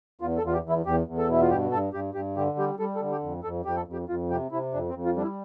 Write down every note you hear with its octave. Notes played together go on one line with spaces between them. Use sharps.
E2 F4
A4
E2 F4
G4
E2
E4
E2 G4
E2
A4
B2 E4
F4
G2 G4
G2 A4
G2 G4
G2 G4
D3 G4
G3 G4
G3 A4
A4
D3
G4
F2
F2 A4
F2 G4
A4
F2
G4
F2 F4
C3 G4
C3 E4
F2 D4
C4
F2
F4
G3 D4
E4